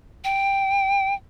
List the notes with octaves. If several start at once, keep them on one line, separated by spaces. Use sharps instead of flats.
G5